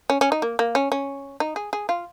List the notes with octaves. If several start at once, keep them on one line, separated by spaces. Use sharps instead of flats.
C#4
C#4
D#4
A#3
A#3
C#4
C#4
D#4
G#4
G#4
F4